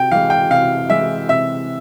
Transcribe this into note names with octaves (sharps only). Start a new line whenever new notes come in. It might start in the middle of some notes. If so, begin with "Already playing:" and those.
Already playing: C3 G5
E3 G#3 F5
G5
C3 F5
E3 G#3 E5
C3 E5